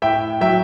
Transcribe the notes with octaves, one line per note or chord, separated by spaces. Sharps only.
A2 E5 G5
F#3 E5 G5